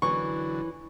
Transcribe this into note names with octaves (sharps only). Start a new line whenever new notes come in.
F#2 D3 E3 F#3 C#6